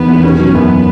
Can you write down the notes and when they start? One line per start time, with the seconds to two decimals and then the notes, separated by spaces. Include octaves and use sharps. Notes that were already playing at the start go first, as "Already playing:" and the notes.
Already playing: E2 D#3 B3
0.08 E1
0.23 D#3 C#4
0.39 F#3
0.55 F#2 B3